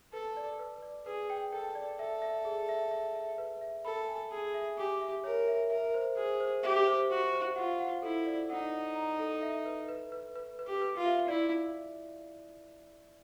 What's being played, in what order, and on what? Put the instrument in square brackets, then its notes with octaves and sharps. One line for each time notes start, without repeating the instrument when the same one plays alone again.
[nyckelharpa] A4 [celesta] B4
[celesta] D5
B4
D5
[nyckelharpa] G#4 [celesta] B4
[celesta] G5
[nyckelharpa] A4 [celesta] G5
[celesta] D5
[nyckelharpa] A4 [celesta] E5
[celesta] E5
G#4
E5
E5
E5
B4
E5
[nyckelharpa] A4 [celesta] B5
[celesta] G#5
[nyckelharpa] G#4 [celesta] G#5
[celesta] E5
[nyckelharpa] G4 [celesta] G#5
[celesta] E5
[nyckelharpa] A#4 [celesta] C#5
[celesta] E5
[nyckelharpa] A#4 [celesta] E5
[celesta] C5
[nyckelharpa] G#4 [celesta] C5
[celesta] C5
[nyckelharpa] G4 [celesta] E5
[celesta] C5
[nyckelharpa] F#4 [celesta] C5
[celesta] C5
[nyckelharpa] F4 [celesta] F#5
[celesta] F#5
[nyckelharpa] E4 [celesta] A4
[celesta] D5
[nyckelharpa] D#4 [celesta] F#5
[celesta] F#5
A#5
A4
E5
B4
B4
B4
B4
B4
[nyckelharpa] G4
[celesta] B4
[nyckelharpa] F4
[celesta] E5
[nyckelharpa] E4 [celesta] D5